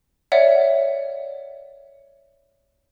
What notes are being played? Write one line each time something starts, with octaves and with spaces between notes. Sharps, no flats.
C#5 D5 E5 F#5